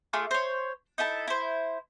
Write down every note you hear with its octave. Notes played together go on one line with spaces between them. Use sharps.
A3 F4 G#4 D6
C5 C#5
D#4 E4 A4 A5
E4 C5